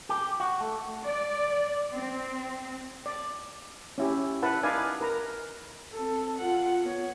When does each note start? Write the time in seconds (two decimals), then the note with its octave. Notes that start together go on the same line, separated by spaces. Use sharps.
0.09 G4
0.40 F#4
0.61 A3
1.06 D5
1.96 C4
3.06 D5
3.98 C#4 E4 G4
4.43 E4 B4 F#5 A5
4.63 D#4 B4 D5 F5 G#5
5.01 A#4 B4 A#5
5.93 C4 A4
6.39 F4 F#5
6.82 B3 C#5